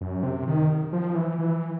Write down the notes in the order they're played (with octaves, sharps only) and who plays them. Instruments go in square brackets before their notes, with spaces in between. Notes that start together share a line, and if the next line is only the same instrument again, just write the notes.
[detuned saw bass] F#2
C3
D#3
F3
E3
E3